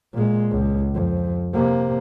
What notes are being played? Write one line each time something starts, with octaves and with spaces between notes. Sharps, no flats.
A#2 G#3
C#2
F2
C3 A#3